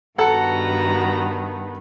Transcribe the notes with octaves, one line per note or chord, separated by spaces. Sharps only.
G2 D#3 B3 F#4 A4 F#5 A#5